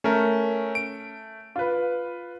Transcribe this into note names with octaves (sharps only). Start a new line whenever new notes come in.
A3 C#4 A#4
D7
F4 B4